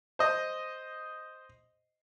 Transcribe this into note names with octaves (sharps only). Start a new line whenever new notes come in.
C5 D#5